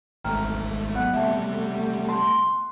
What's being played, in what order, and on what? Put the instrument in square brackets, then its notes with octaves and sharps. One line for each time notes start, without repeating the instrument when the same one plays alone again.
[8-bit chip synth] G#1 G#2 A3 [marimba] G5 A#5 F6
[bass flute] F#3 [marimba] B3 [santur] F#5
[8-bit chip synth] C3 G3 [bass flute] A3 [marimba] E5 A5
[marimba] A5 [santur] C6